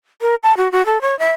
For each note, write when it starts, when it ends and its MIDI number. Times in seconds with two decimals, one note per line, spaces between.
0.21 0.35 70
0.43 0.55 81
0.57 0.70 66
0.72 0.85 66
0.86 1.01 69
1.01 1.18 73
1.19 1.32 76